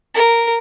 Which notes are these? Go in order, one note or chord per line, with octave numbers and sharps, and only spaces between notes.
A#4